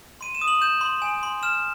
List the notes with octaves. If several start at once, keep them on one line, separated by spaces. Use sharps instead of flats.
C6 D#7
E7
D#6
F#7
G6 E7
C6
G#5
C6
F6 E7